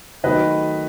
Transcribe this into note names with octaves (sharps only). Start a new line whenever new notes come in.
D#3 F#3 A3 B4 D#5